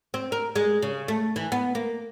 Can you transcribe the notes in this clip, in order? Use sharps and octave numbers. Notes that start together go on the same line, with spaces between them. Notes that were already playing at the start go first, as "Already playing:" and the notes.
C4
A#4
G#3
C#3
A3
E3
B3
A#3